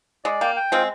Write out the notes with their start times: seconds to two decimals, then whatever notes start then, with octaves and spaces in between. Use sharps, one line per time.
0.24 G#3 D5
0.41 A#3 G5
0.56 G5
0.72 G#3 C4 F4